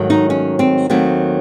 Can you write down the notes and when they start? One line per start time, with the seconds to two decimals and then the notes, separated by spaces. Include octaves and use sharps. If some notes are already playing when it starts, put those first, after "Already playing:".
Already playing: G#2 D#3 F#3 A3
0.10 D#4
0.30 C#4
0.59 C4
0.90 D#2 D#3 F#3 A3 C4